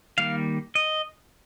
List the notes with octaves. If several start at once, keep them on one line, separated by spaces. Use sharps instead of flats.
D#3 G3 A#3 F5
D#5